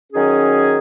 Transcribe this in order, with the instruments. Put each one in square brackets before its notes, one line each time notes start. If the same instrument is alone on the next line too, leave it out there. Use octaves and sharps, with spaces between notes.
[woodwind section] D#3 F#3 C#4 G#4